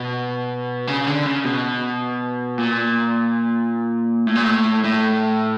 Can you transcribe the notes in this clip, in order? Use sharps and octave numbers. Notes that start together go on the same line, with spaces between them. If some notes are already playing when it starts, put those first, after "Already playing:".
Already playing: B2
C#3
D3
C#3
B2
A#2
A2
A#2
A2
A2